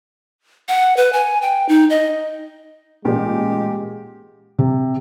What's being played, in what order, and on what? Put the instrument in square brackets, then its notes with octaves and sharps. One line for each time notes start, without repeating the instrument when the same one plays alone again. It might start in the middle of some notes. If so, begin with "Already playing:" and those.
[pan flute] F#5
B4
G#5
G5
D#4
D#5
[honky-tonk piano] A1 A#2 [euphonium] G#3 [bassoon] G4
[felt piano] C3